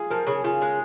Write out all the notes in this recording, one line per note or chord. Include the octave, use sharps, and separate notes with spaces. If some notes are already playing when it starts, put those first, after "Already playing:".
Already playing: F4 G#4
F3 A#4
C#3 G#4
C#3 F4
G#3